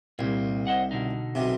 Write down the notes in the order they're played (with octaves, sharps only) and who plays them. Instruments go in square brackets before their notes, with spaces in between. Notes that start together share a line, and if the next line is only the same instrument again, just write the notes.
[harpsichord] C2 [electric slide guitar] A#2 A#3 G4
[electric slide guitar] C5 D#5 F#5
B2 D3 D#4
[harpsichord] B1 C3